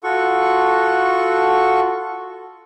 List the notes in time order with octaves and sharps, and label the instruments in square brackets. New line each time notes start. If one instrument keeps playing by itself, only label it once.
[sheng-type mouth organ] F4 F#4 A4 F#5 C#6